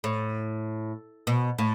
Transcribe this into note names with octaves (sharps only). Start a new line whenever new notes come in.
A2
B2
A2